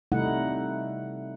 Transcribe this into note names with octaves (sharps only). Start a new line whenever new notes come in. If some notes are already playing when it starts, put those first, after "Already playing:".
C3 G3 A3 D#4 E4 F#5